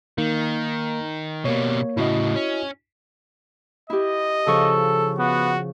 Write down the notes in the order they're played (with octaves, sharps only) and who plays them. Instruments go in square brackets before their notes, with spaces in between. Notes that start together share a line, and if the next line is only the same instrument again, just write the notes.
[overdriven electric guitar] D#3 [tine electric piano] A#3 D#4
[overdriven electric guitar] B2 G3 [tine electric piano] A#3 C#5
[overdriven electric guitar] A2 C#3 [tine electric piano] E4 F#4 D#5
[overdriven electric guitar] C#4
[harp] E4 G4 [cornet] D#5
[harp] C#3 F3 C#6 [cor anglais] A4
[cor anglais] B3 [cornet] F#4